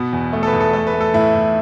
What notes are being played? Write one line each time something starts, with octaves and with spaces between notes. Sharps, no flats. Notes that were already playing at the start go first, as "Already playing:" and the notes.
Already playing: B2 B3
E2
A3
A4
B4
E2
A4
A3 A4
B4
A3
A4
A2 E4
A2